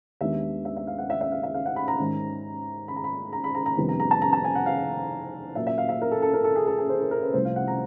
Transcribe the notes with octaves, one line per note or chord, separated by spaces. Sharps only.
D#2 D#3 G#3 B3 D4 E5
E5
E5
F5
F#5
E5
E5
F5
E5
F5
F#5
B5
A#5
G#2 D#3 G#3 C#4
B5
A#5
B5
A#5
B5
A#5
A#5
F2 C3 D#3 G3 B3
A#5
A#5
A5
A#5
A5
G#5
F#5
F5
A#2 F#3 A#3 E5
E5
F5
E5
A#4
A4
A4
A#4
A4
G#4
A4
G#4
C5
A#4
A#4
B4
C2 C3 F3 A3 C#4 C5
F5
F#5
A#5